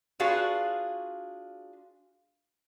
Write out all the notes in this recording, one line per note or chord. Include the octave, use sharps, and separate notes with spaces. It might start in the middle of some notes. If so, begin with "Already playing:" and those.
D4 F4 F#4 G#4 B4 F5